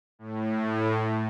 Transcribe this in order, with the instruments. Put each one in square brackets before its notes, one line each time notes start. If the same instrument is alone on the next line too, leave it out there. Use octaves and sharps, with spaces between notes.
[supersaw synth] A2